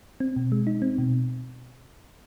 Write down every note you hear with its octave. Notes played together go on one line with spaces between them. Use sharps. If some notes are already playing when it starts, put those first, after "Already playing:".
C4
B2
G#3
D#4
C4
B2